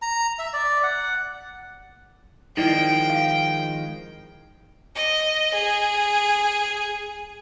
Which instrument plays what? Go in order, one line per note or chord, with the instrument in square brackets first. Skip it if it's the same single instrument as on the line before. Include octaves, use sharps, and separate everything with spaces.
[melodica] A#5
E5
D5
F#5
[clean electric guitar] D#3 F3 G#3 [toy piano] D#4 E4 D5 [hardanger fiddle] G5
[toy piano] F5
[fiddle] D#5
G#4